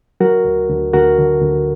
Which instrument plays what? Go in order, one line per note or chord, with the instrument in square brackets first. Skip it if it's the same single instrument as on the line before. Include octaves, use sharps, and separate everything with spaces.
[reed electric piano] F#3 F#4 A#4
D2
D2
D2 F#4 A#4
D3
D2